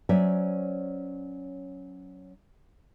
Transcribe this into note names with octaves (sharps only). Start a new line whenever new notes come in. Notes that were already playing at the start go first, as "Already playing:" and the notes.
F#3 C#4 C5 D5 E5